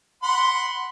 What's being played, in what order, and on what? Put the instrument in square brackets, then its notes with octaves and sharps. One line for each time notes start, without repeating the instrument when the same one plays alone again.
[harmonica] F#5 B5 C6